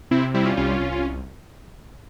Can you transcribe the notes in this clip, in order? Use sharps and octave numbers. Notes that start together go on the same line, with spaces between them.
C3 C4 E4
G3 C4 E4
C#4 F4
C2 C#4 F4
C2
F4